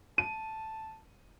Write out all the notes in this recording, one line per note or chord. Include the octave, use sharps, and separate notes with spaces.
A5 D#7